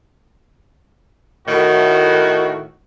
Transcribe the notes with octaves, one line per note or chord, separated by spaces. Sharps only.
A2 D#3 F#4